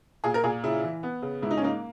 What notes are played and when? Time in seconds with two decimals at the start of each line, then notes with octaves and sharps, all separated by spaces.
0.24 A#2 G#4
0.34 A#4
0.44 A#2 G#4
0.64 C#3 E4
0.84 E3
1.03 B3
1.22 C#3
1.42 G#2 E4
1.51 D#4
1.57 C#4
1.62 A#3 D#4